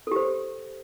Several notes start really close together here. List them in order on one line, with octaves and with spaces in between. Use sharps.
A4 G4 C5